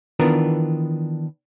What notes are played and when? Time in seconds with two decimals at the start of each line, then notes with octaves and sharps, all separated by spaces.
0.20 D#3 E3 B3 D4 F4 A#4